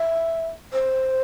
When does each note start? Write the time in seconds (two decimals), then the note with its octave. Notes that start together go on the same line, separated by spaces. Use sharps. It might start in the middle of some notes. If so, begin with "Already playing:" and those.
Already playing: E5
0.73 C5